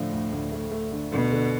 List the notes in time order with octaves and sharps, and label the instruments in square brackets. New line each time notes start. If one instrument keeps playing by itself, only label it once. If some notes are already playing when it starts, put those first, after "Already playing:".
Already playing: [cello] A2 [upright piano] D3 F3 A3
[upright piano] D2
D2
A3
A3
D3
[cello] B2 [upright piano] D3
[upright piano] D3